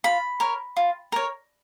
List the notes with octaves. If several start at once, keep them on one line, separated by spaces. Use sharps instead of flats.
F4 B5
A#4 C#5
F4
A#4 C#5